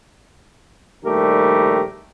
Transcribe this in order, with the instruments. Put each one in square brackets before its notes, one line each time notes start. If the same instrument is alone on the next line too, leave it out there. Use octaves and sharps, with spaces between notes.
[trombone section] A#1 D#3 G3 A3 G4 A#4